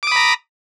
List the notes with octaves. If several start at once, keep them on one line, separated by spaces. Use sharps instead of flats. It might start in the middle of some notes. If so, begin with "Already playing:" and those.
A#5 B5 D6 D#6